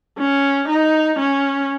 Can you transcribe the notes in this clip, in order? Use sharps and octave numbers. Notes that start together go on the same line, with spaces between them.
C#4
D#4
C#4